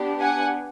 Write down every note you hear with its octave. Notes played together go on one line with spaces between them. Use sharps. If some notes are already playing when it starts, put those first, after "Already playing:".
Already playing: B3 D4 G4
F#5 G#5